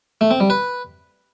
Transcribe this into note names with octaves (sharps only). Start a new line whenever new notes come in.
A3
C4
G3
B4